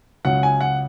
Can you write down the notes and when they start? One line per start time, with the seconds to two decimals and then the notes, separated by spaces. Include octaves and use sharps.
0.25 C#2 C#3 F#3 F#5
0.43 G#5
0.61 F#5